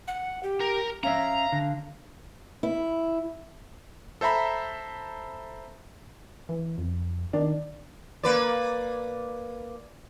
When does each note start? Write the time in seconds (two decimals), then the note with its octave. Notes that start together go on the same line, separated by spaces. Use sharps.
0.08 F#5
0.43 G4
0.60 A#4
1.03 C#4 C#5 E5 F5 A#5
1.52 D3
2.63 E4
4.21 A4 C5 E5 A#5 B5
6.49 E3
6.78 F2
7.33 D#3 D4
8.23 A#3 B4 D5